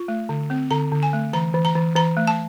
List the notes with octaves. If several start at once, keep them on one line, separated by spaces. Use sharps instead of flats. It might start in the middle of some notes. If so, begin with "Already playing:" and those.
Already playing: F4
A3
D3
C4
D3 A#5
D3
G#5
A3
E3 A#5
E3
A#5
E3
E3 A#5
A3
A5